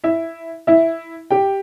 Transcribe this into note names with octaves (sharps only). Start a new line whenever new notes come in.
E4 E5
E4 E5
G4 G5